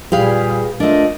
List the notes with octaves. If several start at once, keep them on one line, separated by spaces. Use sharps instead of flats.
A#2 G3 G4 G#4 B4 F5
A3 D4 F4 A#4 D#5